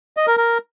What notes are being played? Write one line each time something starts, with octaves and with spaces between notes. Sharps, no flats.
D#5
A#4
A#4